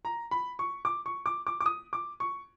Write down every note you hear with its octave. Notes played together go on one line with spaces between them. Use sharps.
A#5
B5
C#6
D6
C#6
D6
D6
D6
D#6
D6
C#6